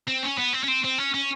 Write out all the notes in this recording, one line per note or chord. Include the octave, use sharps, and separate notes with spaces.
C4
C#4
B3
C4
C#4
C4
C4
C#4
C#4